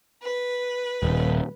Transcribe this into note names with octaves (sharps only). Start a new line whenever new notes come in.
B4
D#1